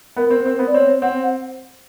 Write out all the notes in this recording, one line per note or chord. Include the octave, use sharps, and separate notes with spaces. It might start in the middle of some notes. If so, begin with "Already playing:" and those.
B3 A#4
C4
C4
B3
D5
C4 C#5
C4 F#5